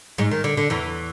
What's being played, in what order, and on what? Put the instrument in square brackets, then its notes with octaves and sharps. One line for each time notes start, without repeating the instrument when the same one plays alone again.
[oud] G#2 G#3
D#3
D3
D3
E2 E3